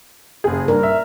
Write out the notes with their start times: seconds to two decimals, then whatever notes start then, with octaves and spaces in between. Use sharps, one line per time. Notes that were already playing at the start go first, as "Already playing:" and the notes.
0.44 F#1 G#4
0.68 G2 A#4
0.83 E5